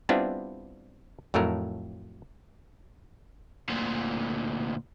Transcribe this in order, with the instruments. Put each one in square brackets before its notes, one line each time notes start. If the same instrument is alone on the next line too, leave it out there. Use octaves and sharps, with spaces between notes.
[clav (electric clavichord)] G3 B3 C4 D4 E4 F4
F2 A2 F#3 A3 A#4
[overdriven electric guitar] D2 A#2